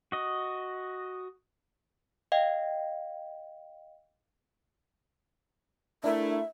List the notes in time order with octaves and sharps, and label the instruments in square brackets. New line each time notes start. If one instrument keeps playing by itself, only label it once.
[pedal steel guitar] F#4 D#5
[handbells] D#5 F5 G5
[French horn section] A3 E4 [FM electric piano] D4 A#4 [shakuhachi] E5